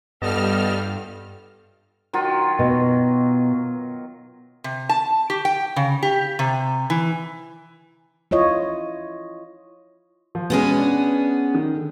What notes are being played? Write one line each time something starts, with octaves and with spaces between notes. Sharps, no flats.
G2 G3 B3 F4 A4 D#5 A5 F6
D#3 F#3 F4
B2
C3
A5
G4
G5
C#3
G4
C3
E3
E4 F4 C#5 D#5
F3
B2 G#3 B3 C#4 G#4
D4
D#3
D3